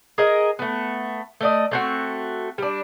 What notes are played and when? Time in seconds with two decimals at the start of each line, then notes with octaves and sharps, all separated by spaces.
0.18 G#4 A#4 D#5
0.59 A3 B3
1.41 A3 D5 D#5
1.71 A3 C4 F#4
2.58 G3 D4